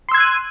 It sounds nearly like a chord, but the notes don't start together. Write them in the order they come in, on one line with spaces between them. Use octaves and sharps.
C6 E6 G#6 F#6 D#7